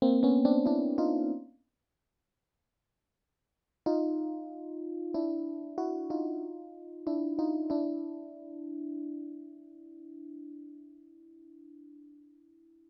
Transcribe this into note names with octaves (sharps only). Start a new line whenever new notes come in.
A#3 C4
B3 C#4
C4 D4
D4 E4
D#4 F4
D#4 F4
D4 E4
E4 F#4
D#4 F4
D4 E4
D#4 F4
D4 E4